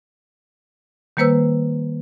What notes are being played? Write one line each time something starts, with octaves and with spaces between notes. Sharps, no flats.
D#3 G3 A#3 B4 C5 E6